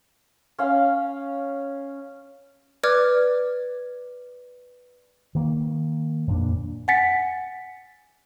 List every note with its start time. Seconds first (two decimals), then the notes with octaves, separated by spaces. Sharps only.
0.58 C#4 F5 G#5
2.83 B4 D5 D6 F6 G#6
5.35 D#3 A#3
6.27 F2 A#2 D4
6.88 F#5 G#5 A6 B6 C#7